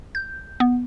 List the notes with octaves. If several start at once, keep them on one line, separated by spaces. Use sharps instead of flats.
G6
B3